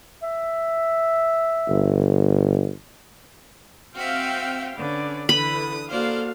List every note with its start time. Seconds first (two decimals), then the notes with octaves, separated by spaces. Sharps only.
0.23 E5
1.69 G1
3.95 C4 F#4 E5 F5 G5
4.77 D3 C#4 B4 D5
5.29 D3 E3 B4 B5 D#6
5.90 A#3 F#4 A4 C5 D5 F5